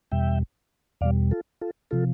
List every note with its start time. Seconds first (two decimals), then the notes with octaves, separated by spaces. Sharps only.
0.11 E2 B2 G3 E5 G5
1.01 E2 B2 G3 D5 F5
1.31 F4 A4
1.61 F4 A4
1.91 C3 F3 F4 A4